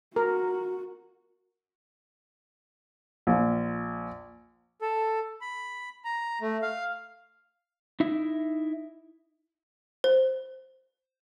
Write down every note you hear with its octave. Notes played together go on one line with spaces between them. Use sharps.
F#4 A#4
A#1
A4
B5
A#5
A3
F5
D#4 E4 E5
C5